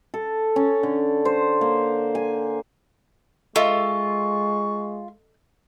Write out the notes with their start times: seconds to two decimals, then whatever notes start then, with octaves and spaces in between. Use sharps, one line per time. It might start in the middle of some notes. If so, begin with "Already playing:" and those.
0.14 A4
0.56 C#4
0.83 D3
1.25 C5
1.61 A#3
2.15 G#5
3.56 G#3 F4 A4 D#5 E5 C#6